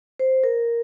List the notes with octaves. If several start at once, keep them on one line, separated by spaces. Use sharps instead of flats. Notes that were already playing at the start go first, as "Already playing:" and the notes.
C5
A#4